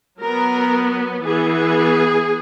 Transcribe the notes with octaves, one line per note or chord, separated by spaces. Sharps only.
F#3 B3 A#4
E3 B3 G#4